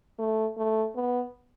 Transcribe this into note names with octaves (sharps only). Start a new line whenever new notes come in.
A3
A3
B3